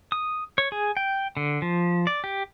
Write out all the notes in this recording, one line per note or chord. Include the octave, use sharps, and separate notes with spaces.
D#6
C#5
G#4
G5
D3
F3
D5
G4